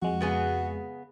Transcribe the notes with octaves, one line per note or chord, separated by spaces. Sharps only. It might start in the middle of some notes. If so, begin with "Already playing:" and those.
F2 G#3 F#4
C#3 B3 G#4